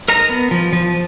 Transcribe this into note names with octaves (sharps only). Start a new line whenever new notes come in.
D#4 A#4 A#5
B3
F3
F3